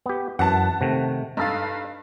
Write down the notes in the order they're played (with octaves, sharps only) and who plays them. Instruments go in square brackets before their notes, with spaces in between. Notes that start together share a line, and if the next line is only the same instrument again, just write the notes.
[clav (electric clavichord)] B3 G4
[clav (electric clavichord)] F#2 E3 [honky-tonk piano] F#5 A5
[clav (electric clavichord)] C3 D#3 A3
[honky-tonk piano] G2 F5 [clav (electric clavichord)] D#4 A4